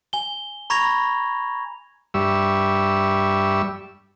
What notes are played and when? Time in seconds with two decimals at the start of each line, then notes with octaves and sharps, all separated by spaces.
0.13 G#5 G7
0.70 A#5 B5 C#6 G#6 A#6 F7
2.14 G2 G3 E5 C#6 E6